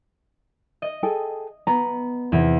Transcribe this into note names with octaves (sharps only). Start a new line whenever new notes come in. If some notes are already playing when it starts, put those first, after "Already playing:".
D#5
G#4 A4 G5
B3 A#5
E2 C3